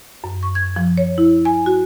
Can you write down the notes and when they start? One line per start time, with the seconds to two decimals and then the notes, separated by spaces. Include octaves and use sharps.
0.24 F#2
0.43 C#6
0.55 G#6
0.76 F3
0.97 C#5
1.18 E4
1.45 G#5
1.66 F#4